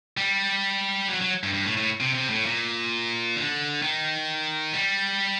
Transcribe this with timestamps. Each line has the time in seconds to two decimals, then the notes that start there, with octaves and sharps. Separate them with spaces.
0.17 G3
1.09 F#3
1.21 F#3
1.43 G2
1.54 G2
1.65 A2
1.77 A2
2.00 C3
2.15 C3
2.30 A2
2.46 A#2
3.36 D3
3.82 D#3
4.73 G3